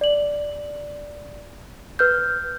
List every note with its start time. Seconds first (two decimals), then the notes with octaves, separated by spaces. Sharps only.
0.01 D5 F#7
1.99 B4 F6 G6